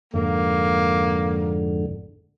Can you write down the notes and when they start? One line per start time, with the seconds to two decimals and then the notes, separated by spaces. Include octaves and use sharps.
0.14 F2 G#2 D3 A#3